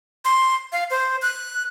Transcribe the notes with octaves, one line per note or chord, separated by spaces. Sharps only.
C6
F5
C5
F#6